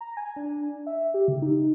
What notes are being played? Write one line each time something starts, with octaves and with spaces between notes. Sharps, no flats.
A#5
G#5
D4
E5
G4
C#3
D#4